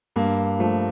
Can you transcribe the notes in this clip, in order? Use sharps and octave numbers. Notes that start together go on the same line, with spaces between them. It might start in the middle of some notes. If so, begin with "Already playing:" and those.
G2 A#3
F3 A3